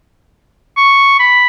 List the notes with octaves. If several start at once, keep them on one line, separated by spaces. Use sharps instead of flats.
C#6
B5